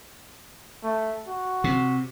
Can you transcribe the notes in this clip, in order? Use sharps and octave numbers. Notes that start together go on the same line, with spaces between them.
A3
F#4
C3